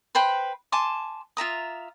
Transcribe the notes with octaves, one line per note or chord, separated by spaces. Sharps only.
B4 C5 G5 B5
G#5 A5 C6 D6
F4 E5 A#5 D#6